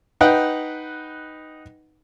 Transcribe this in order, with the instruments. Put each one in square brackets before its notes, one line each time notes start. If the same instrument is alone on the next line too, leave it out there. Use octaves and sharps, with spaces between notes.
[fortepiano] D#4 B4 F#5 G5